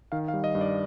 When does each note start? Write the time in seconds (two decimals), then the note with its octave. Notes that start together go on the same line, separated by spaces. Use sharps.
0.12 D#3 F5
0.28 F5
0.34 G3
0.44 D#5
0.55 G2
0.61 D5